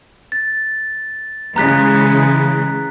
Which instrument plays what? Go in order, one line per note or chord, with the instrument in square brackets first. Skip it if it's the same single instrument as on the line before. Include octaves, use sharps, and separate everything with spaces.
[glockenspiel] A6
[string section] C#3 E3 G#3 [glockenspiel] A#5 F#6 B6